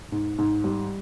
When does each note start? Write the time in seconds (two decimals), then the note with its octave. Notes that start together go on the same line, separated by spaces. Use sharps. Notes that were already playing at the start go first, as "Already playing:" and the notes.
0.12 G#2
0.38 G#2
0.64 G3